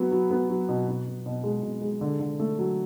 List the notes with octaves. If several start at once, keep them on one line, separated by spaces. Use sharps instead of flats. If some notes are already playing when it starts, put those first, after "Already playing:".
Already playing: F#3 B3
F#3
B3
F#3
B2
B2
B2
B2
G#3
B2
G#3
D3
D3
A3
F#3